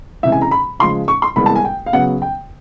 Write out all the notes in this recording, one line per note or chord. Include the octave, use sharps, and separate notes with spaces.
C#2 C3 E3 E5
G#5
A#5
B5
C#3 F3 G#3 C6
C#6
C6
C2 C3 E3 G#3 B3 B5
A5
G#5
G5
F5
C#3 F#3 B3 F#5
G5